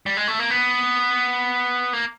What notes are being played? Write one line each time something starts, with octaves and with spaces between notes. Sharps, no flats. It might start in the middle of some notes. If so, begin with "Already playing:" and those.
G3
G#3
A3
A#3
B3
A#3